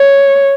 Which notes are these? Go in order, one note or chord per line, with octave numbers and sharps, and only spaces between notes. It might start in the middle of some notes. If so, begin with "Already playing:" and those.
Already playing: C#5